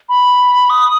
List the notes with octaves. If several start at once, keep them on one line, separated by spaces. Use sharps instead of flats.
B5
D#6